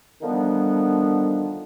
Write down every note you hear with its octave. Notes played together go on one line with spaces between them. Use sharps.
D3 D#3 F3 G3 B3 D4